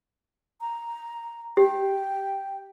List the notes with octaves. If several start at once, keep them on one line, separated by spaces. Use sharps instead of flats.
A#5
G4 G5